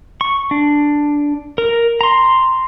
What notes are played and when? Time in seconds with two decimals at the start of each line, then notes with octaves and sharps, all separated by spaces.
0.21 C#6
0.51 D4
1.58 A#4
2.01 A#5 C6